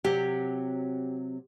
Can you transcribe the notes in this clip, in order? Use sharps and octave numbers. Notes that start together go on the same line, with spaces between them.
C3 F#3 G4